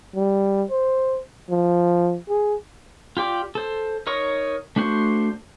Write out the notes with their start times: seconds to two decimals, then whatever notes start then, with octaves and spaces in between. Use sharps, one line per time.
0.15 G3
0.71 C5
1.50 F3
2.29 G#4
3.17 F4 G4 D5 D6
3.55 A4 C5
4.07 D#4 A#4 C#5 C#6 D#6
4.76 A3 D4 F#4 C5 C#6